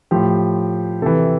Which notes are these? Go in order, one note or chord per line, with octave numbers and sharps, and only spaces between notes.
A2 F3 G4
C3 E3 A4